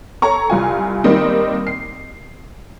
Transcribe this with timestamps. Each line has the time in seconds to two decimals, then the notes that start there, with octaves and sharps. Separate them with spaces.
0.22 A4 C#5 A#5 C#6
0.50 C2 F4 G#5
1.04 D#3 G3 A#3 C4 D#4
1.67 C7